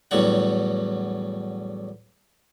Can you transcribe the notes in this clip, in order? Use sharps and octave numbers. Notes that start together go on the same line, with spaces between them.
E2 A2 F#3 G3 F#5